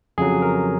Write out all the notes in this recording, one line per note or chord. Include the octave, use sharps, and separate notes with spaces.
F2 C#3 F#3 G#4
A#4